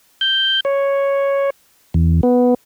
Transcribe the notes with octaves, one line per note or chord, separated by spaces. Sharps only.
G6
C#5
E2
B3